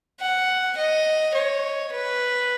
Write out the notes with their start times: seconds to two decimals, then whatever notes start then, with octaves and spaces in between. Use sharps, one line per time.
0.20 F#5
0.77 D#5
1.34 C#5
1.92 B4